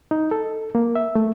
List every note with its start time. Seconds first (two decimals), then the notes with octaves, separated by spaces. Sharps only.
0.11 D#4
0.31 A4
0.75 A#3
0.95 E5
1.15 A3